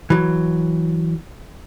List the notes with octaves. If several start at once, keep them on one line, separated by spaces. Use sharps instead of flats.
E3 F#3